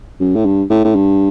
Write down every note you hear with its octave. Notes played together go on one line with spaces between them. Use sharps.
F#2
A2
G2
A2
A2
G2